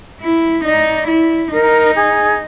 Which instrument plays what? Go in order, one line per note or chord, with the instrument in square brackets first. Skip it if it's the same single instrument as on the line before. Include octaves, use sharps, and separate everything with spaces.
[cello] E4
[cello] D#4 [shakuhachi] D5
[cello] E4
[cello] D#4 [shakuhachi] A#4
[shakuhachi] G#4